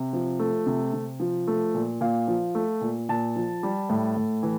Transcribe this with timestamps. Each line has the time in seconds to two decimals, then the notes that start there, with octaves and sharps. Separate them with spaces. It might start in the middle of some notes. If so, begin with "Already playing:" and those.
Already playing: C3
0.13 F3
0.39 A3
0.66 C3
0.93 C3
1.20 F3
1.48 A3
1.74 A#2
2.01 A#2 F5
2.28 F3
2.55 A3
2.81 A#2
3.09 A#2 A5
3.36 F3
3.63 G3
3.89 A2
4.16 A2
4.43 E3